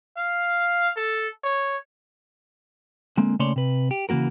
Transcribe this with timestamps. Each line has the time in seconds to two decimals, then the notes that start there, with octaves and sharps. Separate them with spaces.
0.17 F5
0.96 A4
1.43 C#5
3.17 D3 G#3 A#3 C4
3.40 C#3 A3 A#3 C#5 D5 C6
3.56 C3 B4
3.91 G4
4.09 C#3 E3 A#3 F#4 A#4